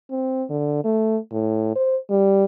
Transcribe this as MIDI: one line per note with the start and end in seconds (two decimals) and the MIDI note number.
0.11 0.45 60
0.50 0.82 50
0.84 1.18 57
1.32 1.73 45
1.75 1.97 72
2.10 2.45 55